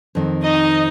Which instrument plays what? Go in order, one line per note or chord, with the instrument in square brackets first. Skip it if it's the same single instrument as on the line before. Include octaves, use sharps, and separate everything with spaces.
[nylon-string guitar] F2 D#3 C4
[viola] D#4 [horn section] D#5